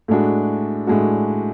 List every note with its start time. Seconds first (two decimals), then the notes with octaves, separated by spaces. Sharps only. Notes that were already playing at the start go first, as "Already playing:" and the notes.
0.08 A2 G#3 D4 F#4
0.87 A2 G#3 D4 F#4